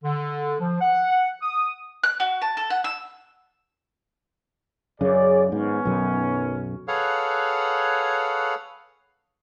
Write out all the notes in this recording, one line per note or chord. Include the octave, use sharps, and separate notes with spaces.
D3
F3
F#5
D#6
F#6
F#4
A5
A4
F#5
E6
F#2 C#3 G#4 C#5 D5
G#2 D#3 B3 C#4
B1 F#2
G#4 A4 B4 C#5 F5 F#5